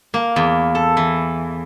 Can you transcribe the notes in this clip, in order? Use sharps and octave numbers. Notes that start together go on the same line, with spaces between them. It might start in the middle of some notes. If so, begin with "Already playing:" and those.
A#3
E2
A4
E3